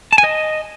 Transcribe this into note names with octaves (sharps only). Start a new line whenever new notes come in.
A5
G#5
D#5